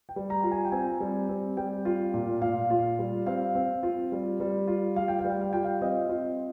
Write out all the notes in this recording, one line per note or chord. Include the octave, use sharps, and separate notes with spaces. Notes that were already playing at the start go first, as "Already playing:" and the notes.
G5
G3
A#5
F4
G#5
G5
C4 G#5
G3
C4
G3 G5
F4
A#2
A#2 F5
F4
G3
C4 F5
C4
F4
G3
G3
F4
G3 F5
G5
F5
G3
G5
F5
F4 G5
F5
C4 D#5
F4